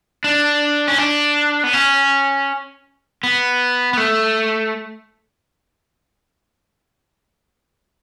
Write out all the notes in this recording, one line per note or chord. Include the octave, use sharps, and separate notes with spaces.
D4
C#4
D4
B3
C#4
B3
B3
A3